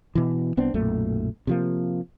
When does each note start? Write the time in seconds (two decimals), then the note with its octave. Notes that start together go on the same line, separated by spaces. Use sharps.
0.15 B2 E3
0.57 C2 B3 C4 D4
0.74 B1 F#2 A#2 A3
1.47 C3 F3 A#3